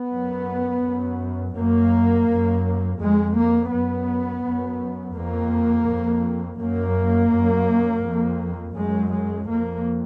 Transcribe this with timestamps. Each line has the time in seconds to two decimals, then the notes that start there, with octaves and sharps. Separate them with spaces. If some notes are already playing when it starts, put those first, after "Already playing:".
Already playing: B3
0.12 F#2
0.84 F#2
1.56 F#2 A#3
2.28 F#2
2.99 F2 G#3
3.36 A#3
3.72 F#2 B3
4.44 F#2
5.15 F2 A#3
5.88 F2
6.59 F#2 A#3
7.32 F#2
8.03 F2
8.75 F#2 G#3
9.11 G#3
9.47 F2 A#3